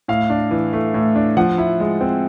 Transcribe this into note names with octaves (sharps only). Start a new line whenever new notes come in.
A2 F5
D4
E3
A3
A2
D4
F3 F#5
E4
G#3
C4